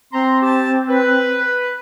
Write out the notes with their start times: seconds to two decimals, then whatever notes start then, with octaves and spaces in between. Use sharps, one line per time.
0.13 C4 A#5 C6
0.42 G4 A5
0.89 B4